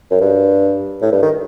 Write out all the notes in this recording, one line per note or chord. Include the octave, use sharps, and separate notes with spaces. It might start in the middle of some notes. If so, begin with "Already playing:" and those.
F#2
G2
A2
G2
D#3